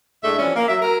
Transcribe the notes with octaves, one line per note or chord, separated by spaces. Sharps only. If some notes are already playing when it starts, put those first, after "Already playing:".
A2 G#3 A3 D4 E5
E3 F3 G3 C#4
A#3
F#3 E5
F#3 A#4